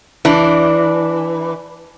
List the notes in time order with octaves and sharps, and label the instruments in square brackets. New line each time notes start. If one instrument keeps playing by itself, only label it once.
[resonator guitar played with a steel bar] E3 D4